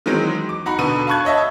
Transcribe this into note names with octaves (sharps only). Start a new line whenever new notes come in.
D#3 E3 F#3 G#3 C4
D6
D#4 F#4 A#5 B5
B2 D3 B4 D#7
F5 A5 B5 C#6 F#6 G#6
C#5 D#5 E5 A5